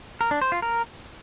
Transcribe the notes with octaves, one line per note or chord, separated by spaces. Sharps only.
A#4
D4
C5
F4
A#4